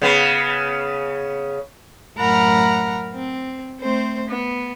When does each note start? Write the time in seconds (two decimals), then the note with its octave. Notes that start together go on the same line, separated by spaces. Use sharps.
0.02 C#3 B3
2.17 F#2 A2 A#4 F#5 A#5 B5
3.13 C4
3.81 A3 C4 C5
4.28 B3